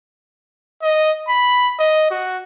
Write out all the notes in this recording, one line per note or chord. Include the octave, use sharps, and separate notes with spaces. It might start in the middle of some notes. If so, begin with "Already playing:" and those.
D#5
B5
D#5
F#4